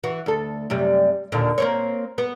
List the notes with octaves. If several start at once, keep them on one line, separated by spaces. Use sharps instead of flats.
E3 F#4
D2 A4
F#2 C3 G3
D#2 A#2 D3
A#3 C4 C#5
B3